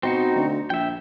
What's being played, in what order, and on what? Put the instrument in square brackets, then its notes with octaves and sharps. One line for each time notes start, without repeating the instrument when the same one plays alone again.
[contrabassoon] B2 [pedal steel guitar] C4 D#4 F#4
[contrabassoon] D2
[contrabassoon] A#1 [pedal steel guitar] E5 G5